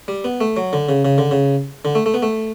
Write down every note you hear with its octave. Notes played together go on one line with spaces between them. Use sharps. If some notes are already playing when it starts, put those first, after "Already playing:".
G3
B3
A3
F#3
D3
C#3
C#3
D3
C#3
D3
A3
A3
B3
A3